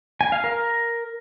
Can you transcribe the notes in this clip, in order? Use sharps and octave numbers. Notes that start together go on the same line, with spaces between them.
G#5
F5
A#4